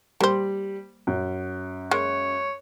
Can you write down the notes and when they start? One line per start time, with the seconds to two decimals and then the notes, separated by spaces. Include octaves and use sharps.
0.21 G3 A#3 C5
1.07 F#2
1.91 G#3 A#3 C#5